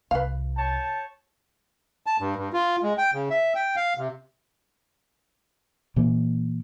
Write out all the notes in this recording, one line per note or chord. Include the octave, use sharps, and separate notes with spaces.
C2 B4 F5
C#5 G5 A5
A5
G2
G2
F4
G#3
G5
C#3
E5
G5
F5
C3
A#2 E3 A#3